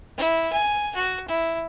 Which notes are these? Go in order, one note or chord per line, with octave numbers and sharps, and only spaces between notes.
E4
G#5
F#4
E4